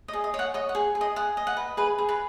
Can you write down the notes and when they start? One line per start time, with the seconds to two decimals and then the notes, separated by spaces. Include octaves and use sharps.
0.08 D#5
0.13 G#4
0.24 D#5
0.34 C#5
0.39 F#5
0.54 C#5 D#5
0.69 F#5
0.75 G#4
0.95 G#4
1.01 D#5
1.16 G#4 F#5
1.37 D#5
1.47 F#5
1.57 B4
1.77 G#4 B4 B5
1.98 G#4
2.09 B4 B5